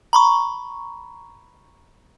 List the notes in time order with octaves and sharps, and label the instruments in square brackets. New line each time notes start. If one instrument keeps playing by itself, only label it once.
[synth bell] A#5 B5 C#6